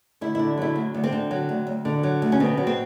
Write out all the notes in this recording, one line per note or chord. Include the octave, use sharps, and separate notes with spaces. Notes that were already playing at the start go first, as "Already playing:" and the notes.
D2 E4
D3 E4
F#3 E4
D2
D2
C4
D3
F#3
D2
D2
D3
F#3
D2
C#4
B2 C4
F#3
C4